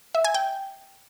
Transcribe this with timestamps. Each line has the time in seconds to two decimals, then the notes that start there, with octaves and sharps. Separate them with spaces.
0.15 E5
0.24 G#5
0.34 G5